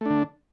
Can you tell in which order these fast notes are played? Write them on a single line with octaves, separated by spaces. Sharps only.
A3 D4 D3